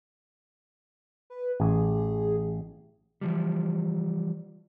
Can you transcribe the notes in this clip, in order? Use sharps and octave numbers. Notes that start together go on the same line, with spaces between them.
B4
A1 G#4
E3 F3 G3